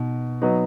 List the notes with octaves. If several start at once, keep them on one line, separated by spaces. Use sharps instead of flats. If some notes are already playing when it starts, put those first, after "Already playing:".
Already playing: B2 D#4
F#3 B3 D#4